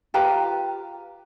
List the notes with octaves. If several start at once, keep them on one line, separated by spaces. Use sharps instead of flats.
F4 G4 B4 A#5